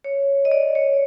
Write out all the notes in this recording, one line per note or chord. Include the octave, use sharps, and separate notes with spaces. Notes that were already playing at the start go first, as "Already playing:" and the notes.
C#5
D#5
D5
C#5